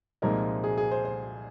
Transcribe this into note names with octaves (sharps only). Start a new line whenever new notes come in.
C2 A#2 F3 G#3 D#4 A#4
G#4
G#4
C5
C5